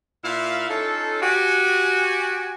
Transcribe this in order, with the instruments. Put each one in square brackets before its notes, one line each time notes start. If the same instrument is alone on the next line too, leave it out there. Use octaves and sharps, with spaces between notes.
[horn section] A#2 E4 F5
C#4 D#4 F4 A4
F#4 G4 G#5